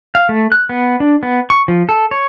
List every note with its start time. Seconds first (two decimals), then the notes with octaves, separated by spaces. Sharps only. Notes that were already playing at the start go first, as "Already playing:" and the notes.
0.15 F5
0.29 A3
0.52 F#6
0.69 B3
1.00 D4
1.23 B3
1.50 C#6
1.68 F3
1.89 A4
2.11 C#5